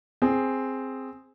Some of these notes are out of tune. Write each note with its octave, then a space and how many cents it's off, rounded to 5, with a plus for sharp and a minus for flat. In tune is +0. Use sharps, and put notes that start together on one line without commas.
C4 +0 G#4 +0